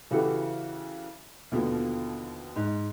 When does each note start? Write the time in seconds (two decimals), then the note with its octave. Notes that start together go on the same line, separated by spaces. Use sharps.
0.11 C#3 E3 F#4 G4 A4
1.52 D#2 B2 D3 F3
2.56 G#2